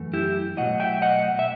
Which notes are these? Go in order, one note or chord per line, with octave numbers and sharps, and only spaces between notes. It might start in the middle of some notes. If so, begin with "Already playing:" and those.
Already playing: F#2 E3 A3
E4 G4
B2 F#3 A3 D#5 F#5
E5 G5
D#5 F#5
E5